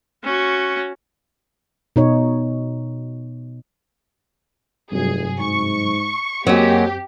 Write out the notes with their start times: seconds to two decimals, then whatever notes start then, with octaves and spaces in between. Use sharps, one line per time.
0.24 C#4 F#4
1.96 B2 D#4 C#5
4.92 F1 G2 C3 F#3 G#4
5.39 G#2 C#6
6.47 F#2 F#3 G#3 A#3 C4 G4